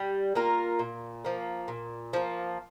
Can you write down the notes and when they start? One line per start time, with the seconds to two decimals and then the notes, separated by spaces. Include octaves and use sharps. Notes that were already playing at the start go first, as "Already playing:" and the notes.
Already playing: G3
0.35 A#3 F4 A#4
0.79 A#2
1.25 F3 A#3
1.68 A#2
2.13 F3 A#3